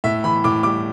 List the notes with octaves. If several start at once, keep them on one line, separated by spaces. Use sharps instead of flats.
A2 E5
E3 B5
A2 D6
G3 D6